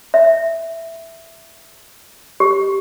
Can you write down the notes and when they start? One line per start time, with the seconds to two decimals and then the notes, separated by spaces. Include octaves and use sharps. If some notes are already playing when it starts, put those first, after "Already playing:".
0.14 E5
2.40 G4